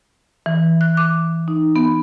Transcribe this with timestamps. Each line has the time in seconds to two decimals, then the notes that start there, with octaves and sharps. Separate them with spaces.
0.46 E3
0.81 F#6
0.97 D6
1.48 D#4
1.76 B3